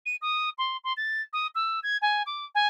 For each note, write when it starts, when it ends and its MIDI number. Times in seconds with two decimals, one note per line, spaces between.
0.06 0.16 99
0.22 0.50 87
0.58 0.77 84
0.84 0.93 84
0.97 1.22 93
1.33 1.47 87
1.55 1.80 88
1.83 1.97 92
2.02 2.23 80
2.26 2.45 86
2.55 2.68 80